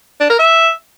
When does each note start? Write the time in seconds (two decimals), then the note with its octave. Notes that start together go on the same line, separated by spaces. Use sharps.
0.20 D4
0.30 A#4
0.39 E5